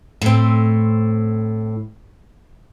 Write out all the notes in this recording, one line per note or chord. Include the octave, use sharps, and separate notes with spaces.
A2 C4